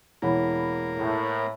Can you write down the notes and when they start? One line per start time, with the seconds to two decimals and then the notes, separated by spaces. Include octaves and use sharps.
0.22 E1 E3 A#3 E4 C#5 F#5 B5
0.97 A2